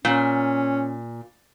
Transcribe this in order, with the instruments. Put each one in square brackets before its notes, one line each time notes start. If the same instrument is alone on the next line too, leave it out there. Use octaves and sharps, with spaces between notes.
[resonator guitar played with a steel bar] A#2 [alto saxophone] C#4